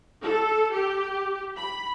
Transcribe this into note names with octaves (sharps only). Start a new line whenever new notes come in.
A4
G4
B5